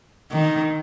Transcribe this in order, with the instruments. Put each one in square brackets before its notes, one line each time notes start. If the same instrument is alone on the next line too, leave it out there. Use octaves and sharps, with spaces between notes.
[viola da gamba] D#3